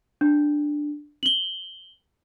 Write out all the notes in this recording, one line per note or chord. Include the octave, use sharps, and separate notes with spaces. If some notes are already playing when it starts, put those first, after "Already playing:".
D4
F#7 G7